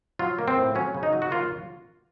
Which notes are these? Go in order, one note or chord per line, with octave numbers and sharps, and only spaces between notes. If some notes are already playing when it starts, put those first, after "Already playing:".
F#3 F4
A#3
C4
A2
F#3 C#4
C#3
D#4
F#3
F#4
A#3 F4